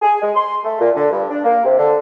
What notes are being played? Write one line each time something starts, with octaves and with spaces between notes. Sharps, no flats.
G#4
G#3
C6
A3
A#2
D3
G2
D4
A#3
C3
D3